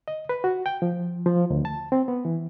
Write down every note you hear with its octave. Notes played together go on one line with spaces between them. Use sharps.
D#5
B4
F#4
G5
F3
F3
D2
A5
C4
B3
E3